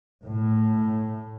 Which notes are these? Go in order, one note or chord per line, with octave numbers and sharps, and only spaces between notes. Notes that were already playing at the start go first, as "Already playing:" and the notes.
A2